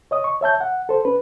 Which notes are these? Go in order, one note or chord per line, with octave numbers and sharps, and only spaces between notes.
C#5 D#5 D#6
C#6
C#5 E5 A5 G6
F#5
A4 C5
C#4 B4